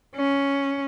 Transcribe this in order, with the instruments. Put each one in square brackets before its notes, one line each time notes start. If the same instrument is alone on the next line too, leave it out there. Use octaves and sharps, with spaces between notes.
[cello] C#4